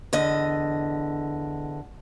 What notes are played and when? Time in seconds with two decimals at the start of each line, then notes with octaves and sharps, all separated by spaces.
0.13 E2 D3 D#5